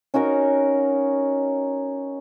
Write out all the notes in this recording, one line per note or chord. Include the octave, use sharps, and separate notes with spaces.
C#4 D#4 F#4 A#4